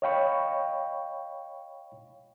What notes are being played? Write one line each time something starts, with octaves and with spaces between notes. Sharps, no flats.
C#5 D#5 F5 G5 B5 C#6